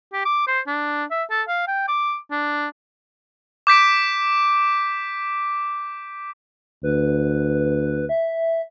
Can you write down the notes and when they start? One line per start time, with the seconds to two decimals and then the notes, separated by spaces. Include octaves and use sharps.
0.13 G4
0.25 D6
0.47 C5
0.67 D4
1.11 E5
1.30 A4
1.48 F5
1.67 G5
1.88 D6
2.31 D4
3.67 D6 G6 B6 D7
6.83 D2 B4
8.09 E5